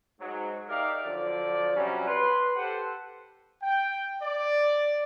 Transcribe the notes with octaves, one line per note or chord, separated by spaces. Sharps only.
G#2 F#3
D#4 G4 A#4 D5 E5 F5
D3 F3 F#3 D5
C3 F#3 G3 C#4
B4 C6
G4 A4 B4 C5 F#5
G5
D5